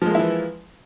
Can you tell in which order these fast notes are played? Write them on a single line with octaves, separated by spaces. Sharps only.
F3 G#3 A#3 E4 E3